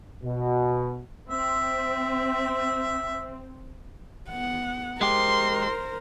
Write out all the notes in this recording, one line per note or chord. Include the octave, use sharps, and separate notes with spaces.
B2
C4 E5
B3 F#5
G#3 G4 A#4 C5 C6